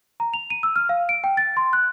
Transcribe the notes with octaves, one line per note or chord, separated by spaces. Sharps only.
A#5
F7
D#7
E6
F6
F5
D7
G5
A6
C6
F#6